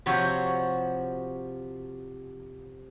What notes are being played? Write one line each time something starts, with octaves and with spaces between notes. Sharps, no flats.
C3 F3 F#4 C#5 G5 C6